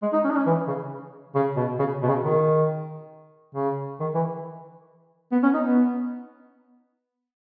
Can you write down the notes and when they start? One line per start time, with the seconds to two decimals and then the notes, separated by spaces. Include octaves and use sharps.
0.02 G#3
0.13 D#4
0.24 C#4
0.30 D#4
0.36 C#4
0.46 E3
0.68 C#3
1.35 C#3
1.56 B2
1.79 C#3
2.02 B2
2.08 C#3
2.23 D#3
3.55 C#3
4.00 D#3
4.14 E3
5.32 B3
5.43 C#4
5.54 D#4
5.64 B3